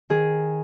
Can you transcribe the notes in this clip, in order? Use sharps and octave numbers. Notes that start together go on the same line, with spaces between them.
D#3 G#4